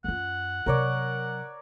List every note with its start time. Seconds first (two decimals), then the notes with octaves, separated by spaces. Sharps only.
0.04 F#2 F4 F#5
0.66 C3 F#3 A#4 C#5 D5